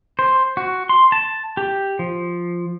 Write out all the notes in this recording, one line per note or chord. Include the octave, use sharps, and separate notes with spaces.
C5
F#4
C6
A5
G4
F3